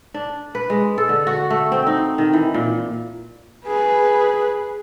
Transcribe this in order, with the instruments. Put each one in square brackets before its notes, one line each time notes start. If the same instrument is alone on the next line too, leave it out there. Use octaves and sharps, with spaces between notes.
[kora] D4
B4
G#3
A4
D3
F#4
A3
C4
D#4
D#3
E3
A#2
[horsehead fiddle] G#4 B4